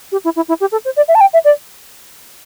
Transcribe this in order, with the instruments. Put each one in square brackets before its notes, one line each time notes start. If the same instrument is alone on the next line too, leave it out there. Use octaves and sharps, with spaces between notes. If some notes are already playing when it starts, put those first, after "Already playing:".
[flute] G4
E4
E4
E4
G4
A4
C5
D5
E5
A5
G5
E5
D5